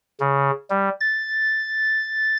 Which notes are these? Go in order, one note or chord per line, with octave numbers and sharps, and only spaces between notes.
C#3
G3
A6